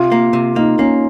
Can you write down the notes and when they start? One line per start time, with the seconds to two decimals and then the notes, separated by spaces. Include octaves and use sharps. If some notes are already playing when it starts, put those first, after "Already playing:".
Already playing: C3 F4
0.12 A#3
0.33 C3
0.56 A#3 D#4
0.79 A#3 C#4